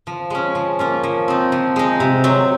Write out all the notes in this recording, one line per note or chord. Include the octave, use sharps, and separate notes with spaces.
F3
G#3 C#4
F3
A#3 C#4 F4
F3
C4 D#4
F3
G#3 D#4
C3
F#3 C4